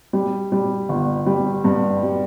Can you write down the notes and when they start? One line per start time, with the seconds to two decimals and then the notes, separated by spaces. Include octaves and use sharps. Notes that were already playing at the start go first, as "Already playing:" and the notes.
0.13 G3
0.52 G3
0.89 G1
1.26 G3
1.64 G2
2.03 G3